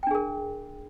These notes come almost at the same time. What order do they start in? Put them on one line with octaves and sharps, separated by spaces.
G5 D4 G#4 A#4